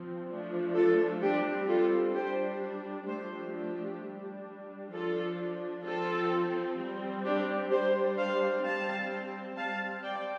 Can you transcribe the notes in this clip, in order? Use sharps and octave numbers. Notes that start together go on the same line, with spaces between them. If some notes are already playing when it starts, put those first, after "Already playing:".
Already playing: F3 C4
F3 A3 D4
F4 A4
G3 C4 D4 G4
F4 A4
G3 D4 G4 C5
F3 A3 D4 G4 C5
D4 G4
G3 D4
F3 D4 F4 A4
F3 C4 F4 A4
G3 C4
D4 G4
G3 D4 G4 C5
C5 F5
G3 C4 F5 A5
G3 C4 F5 A5
D5 G5